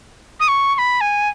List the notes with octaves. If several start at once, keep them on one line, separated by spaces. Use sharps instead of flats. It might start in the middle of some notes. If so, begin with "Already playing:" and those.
D#6
C#6
C#6
B5
G#5